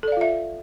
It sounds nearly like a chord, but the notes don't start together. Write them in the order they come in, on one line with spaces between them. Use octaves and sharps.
A4 D5 F5 F4 E5